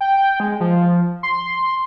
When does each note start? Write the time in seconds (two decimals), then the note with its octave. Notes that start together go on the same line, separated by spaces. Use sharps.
0.01 G5
0.40 G#3
0.60 F3
1.23 C6